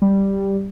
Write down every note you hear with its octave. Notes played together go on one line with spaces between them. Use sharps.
G3